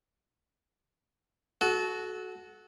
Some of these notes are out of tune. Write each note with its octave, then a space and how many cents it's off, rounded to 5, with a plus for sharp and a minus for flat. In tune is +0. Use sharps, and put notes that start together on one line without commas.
F#4 +0 A4 -30